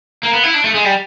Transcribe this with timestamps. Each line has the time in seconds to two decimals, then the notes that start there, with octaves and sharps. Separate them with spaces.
0.23 A#3
0.33 B3
0.43 E4
0.54 D4
0.64 A3
0.74 G#3
0.85 G3